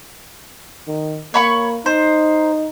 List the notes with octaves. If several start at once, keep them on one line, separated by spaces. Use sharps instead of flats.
D#3
A#3 C#5 B5 C#6
D#4 C5